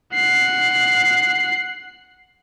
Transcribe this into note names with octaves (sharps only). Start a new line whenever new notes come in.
F#5 C7